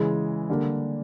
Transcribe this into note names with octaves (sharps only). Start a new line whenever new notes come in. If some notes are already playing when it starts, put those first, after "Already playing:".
Already playing: C#3 E3 G#3
D3 G3 A#3